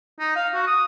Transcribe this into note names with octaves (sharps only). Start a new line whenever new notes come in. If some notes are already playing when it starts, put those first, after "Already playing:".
D#4
F5
F#4
D#6